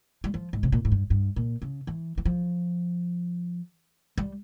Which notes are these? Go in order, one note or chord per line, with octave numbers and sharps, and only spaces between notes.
G3
F3
G#2
C3
A#2
G#2
G2
G2
A#2
C#3
E3
E3
F3
G3